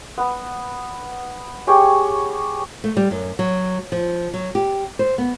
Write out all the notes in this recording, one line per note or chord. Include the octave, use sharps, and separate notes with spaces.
B3
G4 G#4 C#5 G5
A3
G3
F#2
F#3
F3
F#3
G4
C5
B3